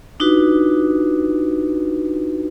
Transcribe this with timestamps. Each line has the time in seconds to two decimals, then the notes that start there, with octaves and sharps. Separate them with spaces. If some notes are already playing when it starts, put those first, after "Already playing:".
0.20 D4 D#4 F4 F#4 B4